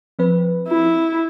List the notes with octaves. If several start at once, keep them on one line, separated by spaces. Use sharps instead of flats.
F3 C4 B4
E4